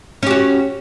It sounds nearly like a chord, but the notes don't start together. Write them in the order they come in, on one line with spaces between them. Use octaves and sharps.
C#4 G4 F#4